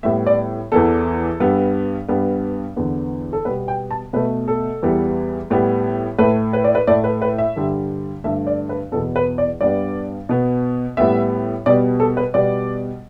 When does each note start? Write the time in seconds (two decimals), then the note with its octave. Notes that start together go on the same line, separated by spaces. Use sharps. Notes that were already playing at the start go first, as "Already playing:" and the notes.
0.03 A2 G3 B3 E5
0.27 D5
0.72 E2 E3 B3 A4
1.40 G2 G3 B3
2.08 G2 G3 B3
2.76 E2 D3 B3
3.33 A4
3.45 B2 G3 B3 B4
3.68 G5
3.91 A5
4.13 B2 A3 B4
4.48 A4
4.83 E2 E3 G3 B3
5.50 A2 G3 B3
6.18 A2 A3 B4
6.53 B4
6.64 D5
6.75 B4
6.87 A2 A3 D5
7.04 B4
7.22 B4
7.38 E5
7.56 G2 D3 G3
8.24 G2 D3 A3 E5
8.47 D5
8.69 B4
8.92 E2 B2 B3 A4
9.16 B4
9.38 D5
9.61 G2 G3 B3 D5
10.29 B2 B3
10.97 A2 G3 B3 E5
11.66 B2 G3 B3 D5
12.00 A4
12.17 B4
12.34 B2 G3 B3 D5